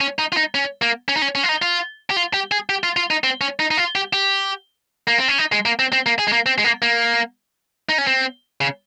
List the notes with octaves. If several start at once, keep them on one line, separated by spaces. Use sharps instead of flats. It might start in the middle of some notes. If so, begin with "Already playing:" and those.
C#4
D#4
F4
D#4
C#4
A#3
C#4
D#4
C#4
C#4
F4
D#4
F4
G4
F4
G4
G#4
G4
F4
F4
D#4
C4
C#4
D#4
D#4
F4
G4
G4
A#3
C4
C#4
D#4
G#3
A#3
C4
C4
A#3
G#4
G#3
A#3
C4
G#3
A#3
A#3
D#4
C#4
C4
C#3